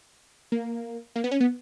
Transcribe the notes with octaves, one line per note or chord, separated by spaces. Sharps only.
A#3
A#3
B3
C#4
B3